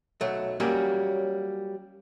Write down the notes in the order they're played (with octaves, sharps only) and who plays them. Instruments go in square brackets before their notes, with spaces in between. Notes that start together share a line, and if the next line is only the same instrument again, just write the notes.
[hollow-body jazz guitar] B1 F#3 A3
F#3 G3 A#3 C#4 G4